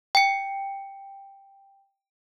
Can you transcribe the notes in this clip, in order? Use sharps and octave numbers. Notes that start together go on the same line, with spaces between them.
G5 C#7